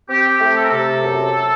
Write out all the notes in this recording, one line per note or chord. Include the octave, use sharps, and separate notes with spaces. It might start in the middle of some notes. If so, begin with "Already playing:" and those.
C4 G4
A3
A4
A#4
C3 A4
F#2